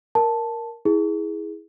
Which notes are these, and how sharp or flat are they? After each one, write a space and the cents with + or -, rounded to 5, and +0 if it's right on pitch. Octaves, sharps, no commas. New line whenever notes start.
A#4 +0 A5 +0
E4 -15 G#4 +0